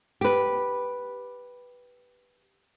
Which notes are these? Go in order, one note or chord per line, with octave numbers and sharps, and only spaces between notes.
G4 B4